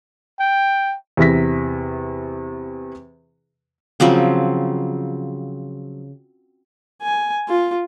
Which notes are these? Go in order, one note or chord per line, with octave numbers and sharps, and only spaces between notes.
G5
E2 C3 E4 A#6 B6
C#3 F3 F#3 C4
G#5
F4